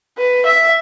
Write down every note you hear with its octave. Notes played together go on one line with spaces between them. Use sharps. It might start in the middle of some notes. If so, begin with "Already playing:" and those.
B4
E5